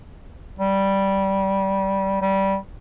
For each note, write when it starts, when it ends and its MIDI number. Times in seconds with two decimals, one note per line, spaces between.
0.59 2.19 55
2.21 2.56 55